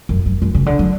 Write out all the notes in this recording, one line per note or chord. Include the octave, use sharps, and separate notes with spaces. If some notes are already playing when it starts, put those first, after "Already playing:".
F#2
F#2
F#2
C#3
D3
F#3